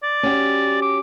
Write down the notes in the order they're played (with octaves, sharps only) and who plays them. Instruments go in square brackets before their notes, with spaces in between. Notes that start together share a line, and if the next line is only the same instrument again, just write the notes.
[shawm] D5
[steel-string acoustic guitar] C#4 F#4 G4
[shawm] D6